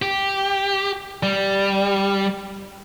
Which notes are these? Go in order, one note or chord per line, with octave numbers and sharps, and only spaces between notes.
G4
G3